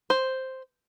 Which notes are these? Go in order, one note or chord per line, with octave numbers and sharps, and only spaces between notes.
C5